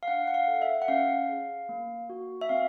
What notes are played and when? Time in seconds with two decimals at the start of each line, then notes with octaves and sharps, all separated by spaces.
0.03 F5
0.08 D4 F#5
0.27 F#5
0.34 F5
0.48 A4
0.62 E5
0.82 F#5
0.88 C#4 F5
1.29 G#4
1.69 A#3
2.10 F#4
2.41 E5
2.49 C4 F5